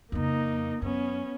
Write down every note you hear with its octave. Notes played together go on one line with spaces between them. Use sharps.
F2 C#3 A#3 D#4
F#2 B3 C#4